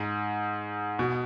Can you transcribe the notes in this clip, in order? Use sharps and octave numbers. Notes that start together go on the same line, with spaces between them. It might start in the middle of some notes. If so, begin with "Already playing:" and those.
Already playing: G#2
B2